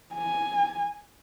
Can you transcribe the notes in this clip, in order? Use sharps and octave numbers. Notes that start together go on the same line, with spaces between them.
G#5